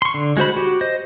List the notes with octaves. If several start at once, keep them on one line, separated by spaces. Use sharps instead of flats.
C6 C#6
D3
G#3 F#4 C5 B5
F#4 G4
C5 D#5